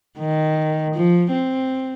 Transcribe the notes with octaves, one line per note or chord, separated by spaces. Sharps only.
D#3
F3
C4